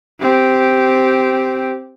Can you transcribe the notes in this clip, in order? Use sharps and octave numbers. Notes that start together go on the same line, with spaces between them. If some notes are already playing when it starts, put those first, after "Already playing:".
C4 G4